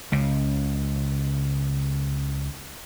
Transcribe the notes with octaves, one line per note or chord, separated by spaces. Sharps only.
C#2 C#3